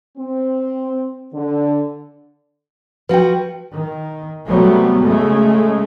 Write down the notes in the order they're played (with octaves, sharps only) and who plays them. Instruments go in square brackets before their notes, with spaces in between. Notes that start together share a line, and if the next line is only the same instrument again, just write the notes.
[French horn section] C4
D3
[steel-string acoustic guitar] F3 F#4 [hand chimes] B4 G5
[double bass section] D#3
C3 F#3 G3 A3 B3
C#3 G#3 A3